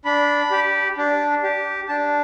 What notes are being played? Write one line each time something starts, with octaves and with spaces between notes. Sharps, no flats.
D4 B5
G4
D4
G4
D4 A5